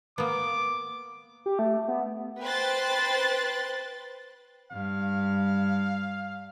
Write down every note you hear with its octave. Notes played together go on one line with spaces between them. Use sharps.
A#3 B3 D6
G4
A3
B3
B4 C5 G5 C6 F#6 A6
G2 F5